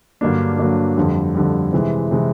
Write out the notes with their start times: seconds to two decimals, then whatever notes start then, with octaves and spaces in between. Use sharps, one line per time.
0.21 G2 D3 F#3 A#3 D4
0.59 G2 D3 F#3 A#3 D4
0.97 F2 D3 G3
1.35 F2 D3 G3
1.73 C3 E3 G#3
2.11 C3 E3 G#3